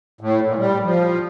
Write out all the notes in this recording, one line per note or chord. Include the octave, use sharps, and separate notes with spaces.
A2
A#2
G3
F3